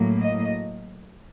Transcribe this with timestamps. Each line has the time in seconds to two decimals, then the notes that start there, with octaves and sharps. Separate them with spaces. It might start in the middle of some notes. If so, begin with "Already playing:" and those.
Already playing: A2 F#3 A#3
0.22 D#5